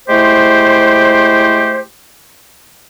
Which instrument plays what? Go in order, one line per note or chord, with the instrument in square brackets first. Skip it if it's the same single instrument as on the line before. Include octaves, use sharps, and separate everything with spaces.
[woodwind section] G#3 A3 E4 G4 C5